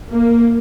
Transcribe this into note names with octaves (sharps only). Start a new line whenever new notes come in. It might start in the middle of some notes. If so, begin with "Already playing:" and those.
A#3